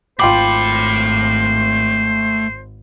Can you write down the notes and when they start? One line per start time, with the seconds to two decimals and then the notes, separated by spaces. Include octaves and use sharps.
0.19 G#1 A3 F4 C5 G5 B5 D6